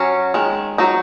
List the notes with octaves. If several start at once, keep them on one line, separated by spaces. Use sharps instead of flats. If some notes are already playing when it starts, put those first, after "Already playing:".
Already playing: F#3 C#4
D#3 G#3
F#3 D#4